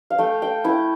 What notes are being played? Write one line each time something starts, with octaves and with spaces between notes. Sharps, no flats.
F5
A3 G5
G5
E4 G5